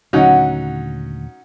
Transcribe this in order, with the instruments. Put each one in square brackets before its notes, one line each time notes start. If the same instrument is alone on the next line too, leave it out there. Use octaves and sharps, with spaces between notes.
[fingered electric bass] D#1 D3 A3 [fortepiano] F#3 C#4 D#4 [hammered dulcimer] F#5